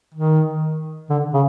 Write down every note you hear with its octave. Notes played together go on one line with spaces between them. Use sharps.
D#3
D3
C#3